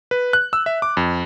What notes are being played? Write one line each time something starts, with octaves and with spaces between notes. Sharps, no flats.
B4
F#6
E6
E5
D6
F2